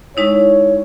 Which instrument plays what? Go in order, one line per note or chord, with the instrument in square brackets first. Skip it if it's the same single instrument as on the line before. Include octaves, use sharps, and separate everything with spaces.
[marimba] G#3 D#4 E4 [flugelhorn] C#5